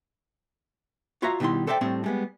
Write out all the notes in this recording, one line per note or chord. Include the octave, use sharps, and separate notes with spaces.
F4 F#4 C#5 E5 F5 A#5
B2 D#3 G3 E4 C6
A4 C5 D5 E5 G5
A2 G3 A3 C4 D4
G3 G#3 B3